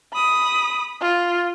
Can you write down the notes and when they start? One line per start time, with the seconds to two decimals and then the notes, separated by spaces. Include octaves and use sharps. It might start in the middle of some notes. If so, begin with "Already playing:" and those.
0.13 B5 D#6
1.01 F4